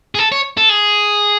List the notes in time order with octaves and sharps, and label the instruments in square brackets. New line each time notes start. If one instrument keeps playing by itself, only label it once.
[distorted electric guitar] G#4
A4
C#5
A4
G#4